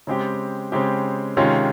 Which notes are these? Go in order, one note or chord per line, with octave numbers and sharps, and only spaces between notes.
C#3 G#3 C4 G4
C#3 G#3 C4 G4
C3 D#3 G#3 C#4 F4